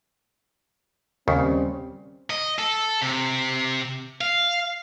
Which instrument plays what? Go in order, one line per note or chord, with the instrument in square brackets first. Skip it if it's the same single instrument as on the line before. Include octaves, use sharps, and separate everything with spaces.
[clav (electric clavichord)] D#2 C#3 [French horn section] G3 C4 C#4
[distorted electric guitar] D#5
A4
C3
F5